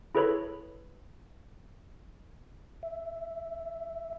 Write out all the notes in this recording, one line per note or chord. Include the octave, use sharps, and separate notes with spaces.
E4 G#4 A4 B4 C#5 B5
E5